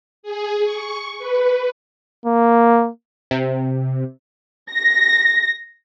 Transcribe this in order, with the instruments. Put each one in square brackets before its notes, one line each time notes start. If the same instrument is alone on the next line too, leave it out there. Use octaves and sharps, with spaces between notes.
[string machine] G#4
C#6
B4
[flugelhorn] A#3
[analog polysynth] C3
[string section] A#6